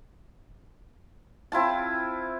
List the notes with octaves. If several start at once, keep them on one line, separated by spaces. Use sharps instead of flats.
C4 E4 F4 A5